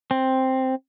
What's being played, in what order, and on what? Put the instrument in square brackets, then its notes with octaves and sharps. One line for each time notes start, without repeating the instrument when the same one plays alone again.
[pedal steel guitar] C4